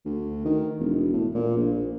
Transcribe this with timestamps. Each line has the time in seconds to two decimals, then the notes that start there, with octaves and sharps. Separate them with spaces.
0.05 D2
0.45 D#3
0.79 E1
1.13 A2
1.34 A#2
1.57 A#1